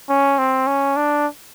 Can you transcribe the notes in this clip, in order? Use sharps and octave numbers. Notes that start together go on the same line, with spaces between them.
C#4
C4
C#4
D4